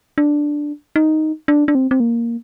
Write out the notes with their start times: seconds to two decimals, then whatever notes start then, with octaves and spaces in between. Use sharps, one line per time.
0.18 D4
0.96 D#4
1.48 D4
1.68 D4
1.75 C4
1.91 C4
2.00 A#3